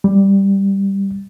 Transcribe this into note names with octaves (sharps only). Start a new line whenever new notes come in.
G3